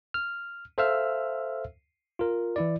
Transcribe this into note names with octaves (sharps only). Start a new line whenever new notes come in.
F6
A4 C5 E5 F5 E6 F6
F4 A#4
E3 E4 D5